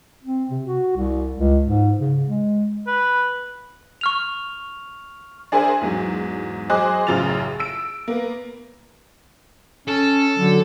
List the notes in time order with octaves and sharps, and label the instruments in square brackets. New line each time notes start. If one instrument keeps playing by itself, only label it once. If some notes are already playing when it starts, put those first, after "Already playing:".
[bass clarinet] C4
C3
F#4
C2
C#2
G#2
C#3
G#3
[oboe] B4
[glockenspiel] C#6 F6 F7
[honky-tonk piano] D4 G#4 A#4 C5 E5 G#5
E2 G#2 F#3
F#3 G#4 C5 D#5 D6 F#6
A1 F#2 C#3 F4 A6 F7
E6 D7
A#3 B3
[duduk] C#4 [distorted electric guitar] A4
[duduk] D3 [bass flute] F#3